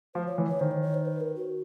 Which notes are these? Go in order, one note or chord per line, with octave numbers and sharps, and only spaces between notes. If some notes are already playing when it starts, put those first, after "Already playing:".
F3 C5
C#5
E3
C#5
D#3 C5
C#5
C#5
C5
B4
A#4
F#4